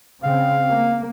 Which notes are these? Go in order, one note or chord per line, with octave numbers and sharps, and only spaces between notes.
C#3 C4 F5
A#3